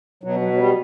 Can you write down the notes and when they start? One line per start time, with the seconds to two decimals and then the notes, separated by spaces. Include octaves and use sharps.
0.23 B2 F#3
0.41 F#3
0.53 F#3
0.58 G3